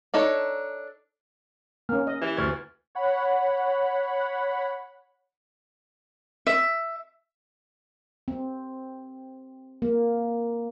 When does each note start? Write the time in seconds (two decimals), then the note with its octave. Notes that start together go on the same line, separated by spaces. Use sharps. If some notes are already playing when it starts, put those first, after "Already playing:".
0.14 D4 D#4 A4 C#5
1.89 A#3 C#4 F6
2.07 D#5
2.21 E3 G4
2.37 D2 B4 C#6 F6 G#6 A6
2.95 C#5 F#5 B5
6.47 E5
8.28 C4
9.82 A#3